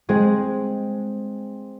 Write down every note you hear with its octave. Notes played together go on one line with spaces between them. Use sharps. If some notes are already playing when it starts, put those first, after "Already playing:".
G#3 C4 G#4